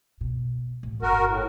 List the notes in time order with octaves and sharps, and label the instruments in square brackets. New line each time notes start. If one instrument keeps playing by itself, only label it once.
[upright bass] B2
A1
[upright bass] G1 [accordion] F#4 A#4
[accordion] A2